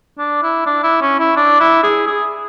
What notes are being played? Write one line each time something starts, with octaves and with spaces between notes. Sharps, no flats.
D4
E4
D4
E4
C#4
E4
D4
E4
G#4
G#4